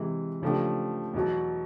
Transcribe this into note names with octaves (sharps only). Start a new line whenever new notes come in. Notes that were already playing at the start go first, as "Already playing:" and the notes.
Already playing: C3 E3 G#3
C#3 F3 A3 D4 G4
E2 B2 F#3